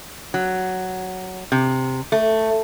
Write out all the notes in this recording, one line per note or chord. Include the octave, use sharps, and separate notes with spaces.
F#3
C3
A3